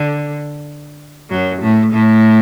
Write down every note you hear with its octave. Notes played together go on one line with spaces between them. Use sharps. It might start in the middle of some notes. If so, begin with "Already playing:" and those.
Already playing: D3
F#2 F#3
A2 A3
A2 A3